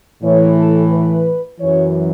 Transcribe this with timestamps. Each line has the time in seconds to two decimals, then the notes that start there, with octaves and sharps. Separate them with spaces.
0.23 A2 E3 C#5
0.57 A4
0.92 B4
1.61 F#2 E3 C#5